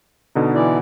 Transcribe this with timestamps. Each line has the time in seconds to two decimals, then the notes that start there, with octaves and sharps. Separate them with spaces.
0.35 B2 D3 D#4
0.54 E3 E4 D5